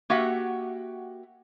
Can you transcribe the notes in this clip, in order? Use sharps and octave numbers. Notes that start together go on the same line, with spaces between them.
A#3 F#4 G4 E5 F#5